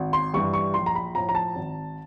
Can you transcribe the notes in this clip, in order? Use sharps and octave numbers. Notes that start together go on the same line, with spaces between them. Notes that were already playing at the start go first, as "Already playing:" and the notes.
Already playing: G#1
C6
G2 E3 G3 C#6
C#6
A#1 C6
A#5
B5
A2 F3 A#5
A#5
A5
G#1